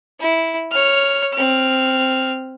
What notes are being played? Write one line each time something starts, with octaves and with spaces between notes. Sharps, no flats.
E4
C#5 F6
C4 F6